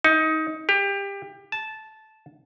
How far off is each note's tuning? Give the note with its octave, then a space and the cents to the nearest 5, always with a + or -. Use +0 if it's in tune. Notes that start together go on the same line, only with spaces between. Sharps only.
D#4 +20
G4 +25
A5 -10